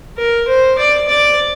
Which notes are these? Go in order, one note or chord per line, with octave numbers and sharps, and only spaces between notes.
A#4
C5
D5
D5